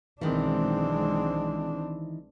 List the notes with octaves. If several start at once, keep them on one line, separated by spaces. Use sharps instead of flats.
B1 D#3 E3 G#3 C4 D4